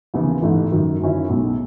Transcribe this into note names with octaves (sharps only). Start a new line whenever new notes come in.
D#2 C#3 E3 B3 E4
A1 G#2 E3 A3
F#2 D#3 F#3
F#2 D#3 F#3 C#4 E4
B1 A2 G#3